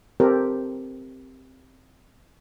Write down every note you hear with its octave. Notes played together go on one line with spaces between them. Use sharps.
C4 G4 A4 A#4 C5